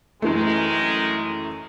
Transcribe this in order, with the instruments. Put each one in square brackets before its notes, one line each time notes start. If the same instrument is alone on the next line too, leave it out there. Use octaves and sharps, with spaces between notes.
[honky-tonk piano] F#2 E3 A3 [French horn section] D#3 G#3